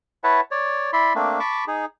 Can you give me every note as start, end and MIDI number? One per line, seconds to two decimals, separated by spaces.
0.24 0.41 64
0.24 0.41 71
0.24 0.41 73
0.24 0.41 76
0.24 0.41 78
0.24 0.41 81
0.51 0.91 73
0.51 0.91 74
0.93 1.13 64
0.93 1.13 74
0.93 1.13 76
0.93 1.13 83
0.93 1.13 84
1.15 1.39 57
1.15 1.39 58
1.15 1.39 60
1.15 1.39 62
1.40 1.65 81
1.40 1.65 83
1.40 1.65 85
1.40 1.65 86
1.67 1.85 63
1.67 1.85 68